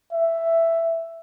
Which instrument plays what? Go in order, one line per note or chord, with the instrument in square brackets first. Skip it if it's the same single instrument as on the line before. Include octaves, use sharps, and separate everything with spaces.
[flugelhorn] E5